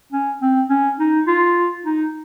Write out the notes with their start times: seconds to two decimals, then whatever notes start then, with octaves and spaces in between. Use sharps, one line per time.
0.12 C#4
0.42 C4
0.70 C#4
0.99 D#4
1.27 F4
1.85 D#4